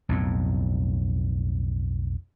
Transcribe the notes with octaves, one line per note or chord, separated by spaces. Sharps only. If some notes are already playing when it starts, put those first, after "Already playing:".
B1 F2 A2